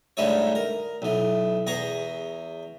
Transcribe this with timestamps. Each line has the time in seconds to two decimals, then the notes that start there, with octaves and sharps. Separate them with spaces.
0.17 D2 G#2 G3 D#4 E4 C#5
0.55 A#4
1.02 B1 E3
1.67 E2 G#4 A#5 C#6